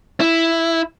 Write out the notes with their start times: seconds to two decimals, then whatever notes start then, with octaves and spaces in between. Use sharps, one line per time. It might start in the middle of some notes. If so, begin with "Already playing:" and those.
0.20 E4